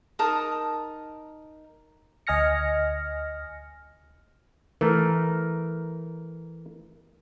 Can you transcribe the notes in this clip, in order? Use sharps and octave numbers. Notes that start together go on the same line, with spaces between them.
D#4 A#4 A5 D#6
D2 D#5 G#5 F6 A#6 C#7
E3 A3 A#4